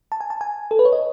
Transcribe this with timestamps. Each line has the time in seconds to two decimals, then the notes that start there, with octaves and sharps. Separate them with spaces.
0.12 A5
0.21 G#5
0.30 A5
0.41 G#5
0.71 A4
0.79 B4
0.85 C#5
0.93 D#5